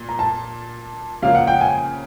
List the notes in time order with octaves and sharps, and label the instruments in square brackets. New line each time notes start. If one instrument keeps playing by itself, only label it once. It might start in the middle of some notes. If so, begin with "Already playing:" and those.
Already playing: [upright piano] A#2
[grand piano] A#5
A5
[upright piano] C#3 F3 A#3 [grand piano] F5
[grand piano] F#5
G5
G#5